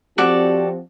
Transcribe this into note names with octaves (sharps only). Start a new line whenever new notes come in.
F3 C4 F#4 G4 A4 D5